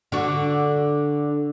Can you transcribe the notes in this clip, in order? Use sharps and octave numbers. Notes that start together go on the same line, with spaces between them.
D3 F#4